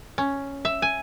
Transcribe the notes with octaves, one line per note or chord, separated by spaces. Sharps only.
C#4
E5
G#5